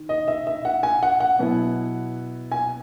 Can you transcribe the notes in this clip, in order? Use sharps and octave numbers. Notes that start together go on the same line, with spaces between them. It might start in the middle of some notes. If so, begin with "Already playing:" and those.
Already playing: D#3
D#5
E5
E5
F#5
G#5
F#5
F#5
B2 F#3 B3 E4
G#5